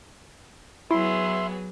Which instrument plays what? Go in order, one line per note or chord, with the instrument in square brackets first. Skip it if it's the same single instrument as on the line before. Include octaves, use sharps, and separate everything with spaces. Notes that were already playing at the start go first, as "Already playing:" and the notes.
[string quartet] F#3 B3 G#4 [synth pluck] E4 [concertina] E5 C6